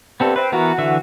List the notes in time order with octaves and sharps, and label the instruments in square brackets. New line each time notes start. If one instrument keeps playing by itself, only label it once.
[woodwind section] G2 [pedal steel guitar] B3 C4 A4
[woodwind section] C4 [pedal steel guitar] B4
[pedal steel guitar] E3 B3 A#4 [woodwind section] F#4
[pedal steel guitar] D3 E3 E5